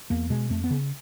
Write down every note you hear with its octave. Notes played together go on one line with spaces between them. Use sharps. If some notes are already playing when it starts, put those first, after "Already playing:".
E2 A#3
B2 G#3
F2 A3
B3
C#3